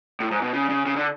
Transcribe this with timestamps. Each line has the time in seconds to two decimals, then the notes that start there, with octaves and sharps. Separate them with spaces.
0.20 A2
0.31 G#2
0.42 B2
0.53 C#3
0.70 C#3
0.86 C#3
0.96 D3